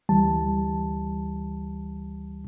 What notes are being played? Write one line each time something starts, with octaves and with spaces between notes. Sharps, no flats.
D2 E3 G3 A5